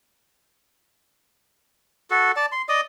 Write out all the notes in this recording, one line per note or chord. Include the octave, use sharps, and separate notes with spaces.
F#4 A4
D5 A5
C6
D5 D#5 D#6